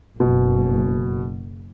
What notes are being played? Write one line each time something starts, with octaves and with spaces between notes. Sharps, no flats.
F#1 B2